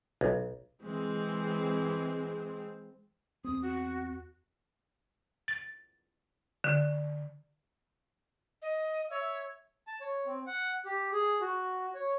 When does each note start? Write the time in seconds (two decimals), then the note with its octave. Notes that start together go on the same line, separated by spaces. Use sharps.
0.21 B1
0.83 E3 G#3 C4
3.45 E2 C4 D#6
3.62 F#4
5.48 A6
6.64 D3
8.62 D#5
9.10 C#5 E5
9.87 A5
10.01 C#5
10.26 C4
10.47 F#5
10.86 G4
11.12 G#4
11.41 F#4
11.95 C#5